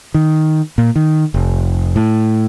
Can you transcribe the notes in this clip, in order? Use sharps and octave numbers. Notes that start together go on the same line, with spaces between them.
D#3
A#2
D#3
F1
A2